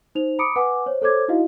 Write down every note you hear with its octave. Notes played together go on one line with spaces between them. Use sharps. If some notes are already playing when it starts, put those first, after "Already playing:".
D#4 C5 F7
A#5 B5 D6 D#6 C#7 D7
B4 F#5 G#5 D6
C5 C#5
A4 C5 C#5 D6 G#6
D#4 E4 F#4 D#5 F5